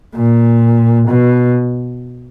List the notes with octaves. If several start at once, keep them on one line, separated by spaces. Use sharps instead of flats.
A#2
B2